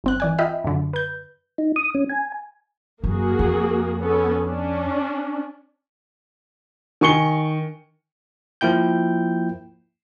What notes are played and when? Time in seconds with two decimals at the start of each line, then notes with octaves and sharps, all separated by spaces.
0.04 G1 C4 F#6
0.20 E3 D5 G#5
0.39 F4 D#5 E5 G5 B5
0.64 F#2 D3
0.93 B4 G6
1.58 D#4
1.76 D#6
1.95 C#4
2.10 G#5
3.04 F#2 A#3 F#4 G#4
3.39 F2
4.01 B3 C#4 A4
4.44 C#4 D4
7.01 D#3 G#5 C#6 C#7 G7
8.61 F3 A#3 E4 G5 G6